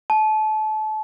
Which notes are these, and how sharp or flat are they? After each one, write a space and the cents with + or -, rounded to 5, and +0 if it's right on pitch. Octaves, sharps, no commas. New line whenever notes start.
A5 -30